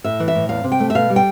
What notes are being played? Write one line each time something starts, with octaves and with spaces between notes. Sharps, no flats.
A2 E5
E3
E5
A2
E2 F5
C3
G5
A3
E5
B2 F5
G3
G5